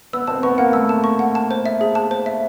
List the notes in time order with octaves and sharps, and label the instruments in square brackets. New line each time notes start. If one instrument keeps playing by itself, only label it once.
[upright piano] B3 [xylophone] E6
[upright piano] C4 [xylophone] A5
[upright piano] B3 [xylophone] C#6
[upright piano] A#3 [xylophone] F#5
[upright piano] A3 [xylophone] E6
[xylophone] A5
C#6
F#5
A5
C5
E5
G#4
A5
C5
E5